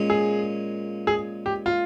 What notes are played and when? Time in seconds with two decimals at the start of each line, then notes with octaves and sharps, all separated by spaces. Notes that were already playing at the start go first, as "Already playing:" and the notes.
Already playing: A#2 G#3 C#4
0.10 G#4
1.07 G#4
1.46 G4
1.66 F4